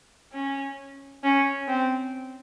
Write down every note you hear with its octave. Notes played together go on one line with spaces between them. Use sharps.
C#4
C#4
C4